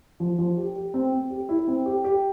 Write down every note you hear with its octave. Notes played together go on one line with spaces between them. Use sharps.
F3
F3
G4
G4
C4
C4
G4
E4
C4
G4
G4